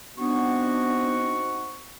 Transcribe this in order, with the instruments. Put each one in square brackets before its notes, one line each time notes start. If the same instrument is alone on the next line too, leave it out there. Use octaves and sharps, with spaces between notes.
[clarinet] B3 [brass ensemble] C4 D#4 F#4 [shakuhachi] D4 [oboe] C#6